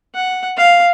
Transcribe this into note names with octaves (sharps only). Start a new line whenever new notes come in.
F#5
F5